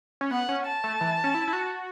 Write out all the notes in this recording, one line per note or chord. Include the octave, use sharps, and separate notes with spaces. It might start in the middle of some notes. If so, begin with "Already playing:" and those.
C#4
B3 F#5
C#4
A5
A3
E3
C#4
E4
E4
F#4